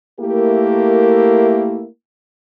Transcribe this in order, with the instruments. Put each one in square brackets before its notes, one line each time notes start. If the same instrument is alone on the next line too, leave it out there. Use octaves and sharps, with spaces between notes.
[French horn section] A3 A#3 E4 G4 A#4